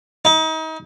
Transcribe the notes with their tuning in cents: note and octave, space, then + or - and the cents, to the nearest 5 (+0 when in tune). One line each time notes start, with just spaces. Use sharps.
D#4 +35